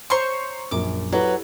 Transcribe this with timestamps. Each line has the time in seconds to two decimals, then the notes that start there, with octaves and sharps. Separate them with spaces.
0.10 C5 C#5 A#5 C6 C#6
0.71 A#1 F#2 A#4 D6
1.12 F#3 E4 G4 A4 B4